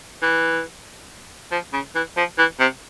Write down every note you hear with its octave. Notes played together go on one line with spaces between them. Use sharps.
E3
F3
C#3
E3
F3
E3
C3